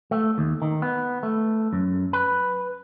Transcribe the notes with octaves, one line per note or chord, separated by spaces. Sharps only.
A3
D#2
D#3
B3
A3
F#2
B4